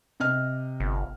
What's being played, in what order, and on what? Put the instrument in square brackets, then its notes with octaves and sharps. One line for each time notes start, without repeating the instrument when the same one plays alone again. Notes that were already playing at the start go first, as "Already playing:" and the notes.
[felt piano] C3 D#5 F6
[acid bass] G1